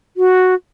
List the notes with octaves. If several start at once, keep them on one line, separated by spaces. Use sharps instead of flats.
F#4